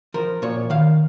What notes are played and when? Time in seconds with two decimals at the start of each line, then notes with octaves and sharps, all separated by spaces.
0.14 F3 A#4
0.42 A#2 C#5
0.70 D#3 F5